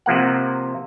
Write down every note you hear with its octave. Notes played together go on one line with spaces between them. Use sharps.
C3 F3 A#3 F#5